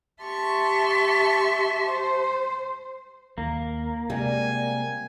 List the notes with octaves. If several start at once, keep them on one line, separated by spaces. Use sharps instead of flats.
G4 E5 A5 C6 C#6
C5
D#2 A#3
C3 G3 G#3 G#5